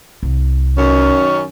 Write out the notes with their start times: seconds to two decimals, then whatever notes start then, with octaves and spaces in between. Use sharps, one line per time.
0.23 C2
0.78 F#2 D#3 C#4